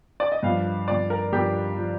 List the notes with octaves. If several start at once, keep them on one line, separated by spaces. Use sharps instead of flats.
D5
D#5
G2 F3 F5
G2 F3 D5
A#4
G2 F3 G4
F3